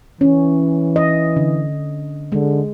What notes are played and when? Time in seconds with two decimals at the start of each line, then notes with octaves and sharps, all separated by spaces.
0.21 E3 C#4
0.96 D#5
1.36 D3
2.32 D3 G#3